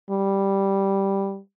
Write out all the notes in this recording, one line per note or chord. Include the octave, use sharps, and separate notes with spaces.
G3